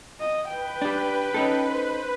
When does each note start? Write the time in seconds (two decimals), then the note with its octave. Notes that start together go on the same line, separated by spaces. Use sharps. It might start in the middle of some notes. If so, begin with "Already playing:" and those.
0.20 D#5
0.48 B4 G5
0.82 D4 G4
1.34 C#4 D#4 A4
1.70 C5